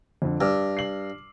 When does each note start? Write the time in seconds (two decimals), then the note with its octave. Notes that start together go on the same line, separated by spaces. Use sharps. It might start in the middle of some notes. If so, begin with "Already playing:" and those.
0.22 F2 D3
0.41 G2 D6 E6 F6
0.77 C7 F#7